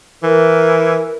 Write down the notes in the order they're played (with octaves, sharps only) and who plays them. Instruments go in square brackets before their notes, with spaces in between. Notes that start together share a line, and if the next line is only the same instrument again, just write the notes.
[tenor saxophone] E3 [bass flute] A#4